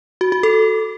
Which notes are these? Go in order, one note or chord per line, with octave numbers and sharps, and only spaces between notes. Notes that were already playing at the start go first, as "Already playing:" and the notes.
F#4
F#4
A4